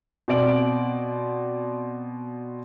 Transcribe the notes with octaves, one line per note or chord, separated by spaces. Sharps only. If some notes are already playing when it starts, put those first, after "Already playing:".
B2 C4 D5 D7 F#7